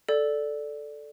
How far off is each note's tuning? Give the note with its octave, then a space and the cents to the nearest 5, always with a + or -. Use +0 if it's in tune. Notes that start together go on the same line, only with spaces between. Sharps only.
A4 -5 D5 +0